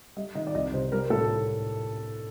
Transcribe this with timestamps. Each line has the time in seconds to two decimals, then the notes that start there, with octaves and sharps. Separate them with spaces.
0.16 G3 D#5
0.35 D#3 D#5
0.47 D5
0.55 C2 D#5
0.73 C3 C5
0.92 G3 A#4
1.10 A2 A4